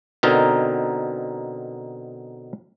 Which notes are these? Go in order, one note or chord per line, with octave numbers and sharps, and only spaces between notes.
B2 D3 C4 D#4 A#4